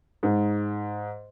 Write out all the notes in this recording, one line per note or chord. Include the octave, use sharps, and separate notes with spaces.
G#2